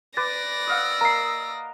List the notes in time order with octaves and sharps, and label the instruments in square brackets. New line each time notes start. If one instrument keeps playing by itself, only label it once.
[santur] B4 D6 [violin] D5 A#6 [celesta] A6
[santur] D#5 F5 F#5 [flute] E6
[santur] A#3 D#5 [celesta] A#5 C7